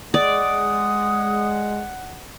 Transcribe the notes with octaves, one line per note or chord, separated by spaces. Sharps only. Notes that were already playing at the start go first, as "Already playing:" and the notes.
G#3 D5 F#5 D#6